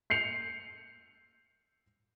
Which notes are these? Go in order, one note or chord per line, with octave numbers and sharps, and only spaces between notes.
G6 C7 C#7 F7